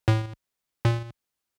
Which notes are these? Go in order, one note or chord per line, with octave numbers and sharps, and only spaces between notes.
A2
A#2